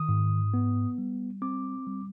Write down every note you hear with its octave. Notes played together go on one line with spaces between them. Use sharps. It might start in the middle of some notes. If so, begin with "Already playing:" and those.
Already playing: D#3 D#6
G#2
B3
G3
C4 D6
G3